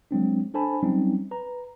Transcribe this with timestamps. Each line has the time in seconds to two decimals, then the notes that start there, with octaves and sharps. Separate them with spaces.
0.11 F#3 G#3 C4 D4
0.54 D4 A4 C5 G#5 A5 B5
0.83 F#3 G3 C4 C#4 D#4
1.31 B4 A#5